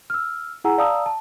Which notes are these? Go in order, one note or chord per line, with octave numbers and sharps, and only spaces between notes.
E6 F6
E4 G#4 F#5 G#5 A#5 E6
D5 F5 A5 A#5 D#6 E6
A5